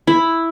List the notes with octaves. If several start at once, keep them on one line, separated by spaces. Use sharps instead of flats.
E4